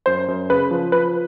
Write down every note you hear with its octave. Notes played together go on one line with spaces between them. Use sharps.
F#2 C5
F#2
C#3 B4
F3
F3 B4